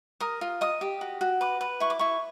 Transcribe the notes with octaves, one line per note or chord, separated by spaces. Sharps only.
A#4 D#6
F4
D#5 D#6
G4
F#4
F#4
B4 D6
B4
E4 C#6
D6
E4 C#6